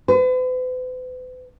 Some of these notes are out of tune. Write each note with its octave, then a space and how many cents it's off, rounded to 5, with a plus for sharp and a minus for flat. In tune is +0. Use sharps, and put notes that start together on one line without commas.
B4 +45